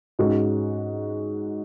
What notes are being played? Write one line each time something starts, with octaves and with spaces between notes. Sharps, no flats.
G#2 G#3 C#4 F#4